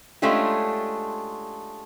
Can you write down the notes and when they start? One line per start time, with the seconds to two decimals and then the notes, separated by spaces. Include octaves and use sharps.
0.22 G#3 A3 C#4 D4 F4 G4